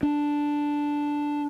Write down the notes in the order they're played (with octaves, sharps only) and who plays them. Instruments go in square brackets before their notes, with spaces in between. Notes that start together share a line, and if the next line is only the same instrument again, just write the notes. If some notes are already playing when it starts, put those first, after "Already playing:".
[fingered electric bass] D4